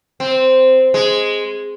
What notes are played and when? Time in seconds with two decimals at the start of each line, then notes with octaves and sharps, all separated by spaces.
0.20 C4
0.94 G#3